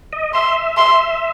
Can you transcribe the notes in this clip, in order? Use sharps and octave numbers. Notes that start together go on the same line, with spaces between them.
D#5
E5 C6
C6